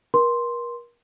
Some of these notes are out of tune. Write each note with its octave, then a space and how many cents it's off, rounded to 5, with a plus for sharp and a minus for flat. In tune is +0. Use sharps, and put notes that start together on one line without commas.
A#4 +35 C6 +0